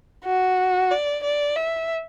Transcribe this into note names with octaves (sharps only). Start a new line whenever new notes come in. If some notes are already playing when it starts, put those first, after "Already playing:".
F#4
D5
D5
E5